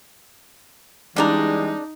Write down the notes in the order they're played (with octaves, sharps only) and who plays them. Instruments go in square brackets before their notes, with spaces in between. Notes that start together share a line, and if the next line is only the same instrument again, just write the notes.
[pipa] C#3 D4 A#5 [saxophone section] E3 G3 G#3 [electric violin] D#4